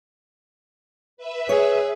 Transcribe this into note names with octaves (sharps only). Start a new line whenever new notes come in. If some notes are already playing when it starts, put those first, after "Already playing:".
B4 E5
G#4 C#5